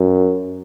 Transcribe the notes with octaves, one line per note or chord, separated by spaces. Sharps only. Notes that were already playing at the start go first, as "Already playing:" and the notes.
Already playing: F#2